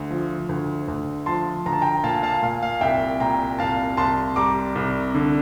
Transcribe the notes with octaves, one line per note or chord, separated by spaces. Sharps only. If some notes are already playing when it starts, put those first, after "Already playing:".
Already playing: D2
F3
D2
D2
F3 A5 C6
D2 A#5
A5
G5 A#5
A#2 F5 A5
F5 A5
A#2 F5
F5
C2 E5 G5
A#2 G5 A#5
C2 F5 A5
C2 A5 C6
G3 A#5 D6
C2
D3